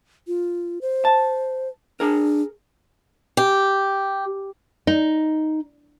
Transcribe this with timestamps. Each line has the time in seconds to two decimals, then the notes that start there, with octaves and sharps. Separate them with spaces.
0.27 F4
0.81 C5
1.05 A5
2.00 D4 G#4 A#4
3.37 G4
4.87 D#4